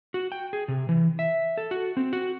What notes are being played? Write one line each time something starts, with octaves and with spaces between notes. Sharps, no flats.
F#4
G5
G#4
C3
E3
E5
A4
F#4
C4
F#4